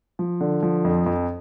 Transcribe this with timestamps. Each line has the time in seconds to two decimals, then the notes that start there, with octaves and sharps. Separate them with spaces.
0.19 F3
0.41 D3
0.63 F3
0.85 F2
1.06 F2